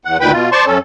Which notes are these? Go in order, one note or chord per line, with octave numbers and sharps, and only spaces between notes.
E2 F#5
D2 A#2 D#3 B4 G5 B5
B2 F4
C5 D5 A5 C6 C#6
F#2 C#4 A4